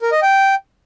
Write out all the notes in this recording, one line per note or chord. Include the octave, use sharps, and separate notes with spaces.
A#4
D#5
G5